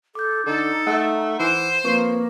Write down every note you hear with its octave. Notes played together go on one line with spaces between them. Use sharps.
A4 D6 G6
D3 D#4 A4
A3 F#5
E3 C5
F3 A#3 C4 B4 C#6